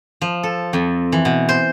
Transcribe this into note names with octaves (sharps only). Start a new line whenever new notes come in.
F3
A4
F2
E3
B2
C5